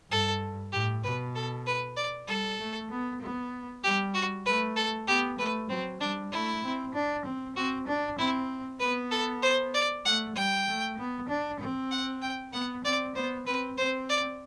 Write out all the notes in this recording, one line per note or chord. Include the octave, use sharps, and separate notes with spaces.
G2 A4
A2 G4
B2 B4
A4
B4
D5
G3 A4
A3
B3
B3
G3 G4
F#4
A3 B4
A4
B3 G4
A3 B4
F#3 C4
G3 D4
A3 E4
C4
D4
C4
C4 F#4
D4
C4 E4
B3 B4
A4
C5
D5
A3 F#5
G3 G5
A3
B3
D4
C4
F#5
G5
B3 F#5
C4 D5
B3 C5
C4 B4
C4 C5
D5